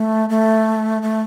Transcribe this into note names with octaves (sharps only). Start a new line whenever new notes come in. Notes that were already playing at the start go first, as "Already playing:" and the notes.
Already playing: A3
A3
A3